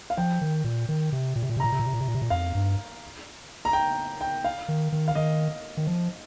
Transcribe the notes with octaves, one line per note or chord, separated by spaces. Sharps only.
F5
F3 G5
D#3
A#2
D#3
C3
A#2
C3
A#2
C3
A#2 A#5
C3
A#2
C3
A#2
C3
A#2
C3
A#2
F2 F5
G2
A#5
G5
G5
F5
D#3
D#3
F5
D#3 D#5
D#3
F3